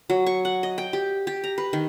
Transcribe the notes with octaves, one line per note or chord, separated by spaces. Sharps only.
F#3
C#6
F#5
D#5
G5
G4
G4
A#5
B4
D#3